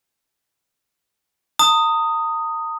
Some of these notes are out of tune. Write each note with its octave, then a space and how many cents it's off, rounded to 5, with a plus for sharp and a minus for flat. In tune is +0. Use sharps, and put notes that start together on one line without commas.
A#5 -45 D#6 +0